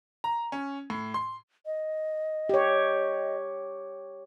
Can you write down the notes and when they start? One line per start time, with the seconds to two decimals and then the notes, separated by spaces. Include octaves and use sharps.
0.24 A#5
0.52 C#4
0.90 A2
1.14 C6
1.66 D#5
2.49 G4 C#5